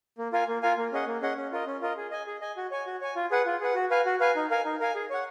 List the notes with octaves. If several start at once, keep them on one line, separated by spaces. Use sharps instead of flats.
A#3
F4 A#4 F5 G#5
A#3
F4 A#4 F5 G#5
A#3
C#4 G#4 D#5 F#5
A#3
C#4 G#4 D#5 F#5
C#4
F4 A#4 D#5
C#4
F4 A#4 D#5
G#4
D#5 G#5
G#4
D#5 G#5
F#4
C#5 G#5
F#4
C#5 G#5
F4
G#4 B4 F#5
F4
G#4 B4 F#5
F#4
B4 F5 G#5
F#4
B4 F5 G#5
D#4
A#4 F5 G#5
D#4
A#4 F5 G#5
G#4
C#5 F#5